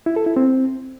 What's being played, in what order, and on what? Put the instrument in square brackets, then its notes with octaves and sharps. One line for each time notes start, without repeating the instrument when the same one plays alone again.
[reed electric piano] E4
A4
E4
C4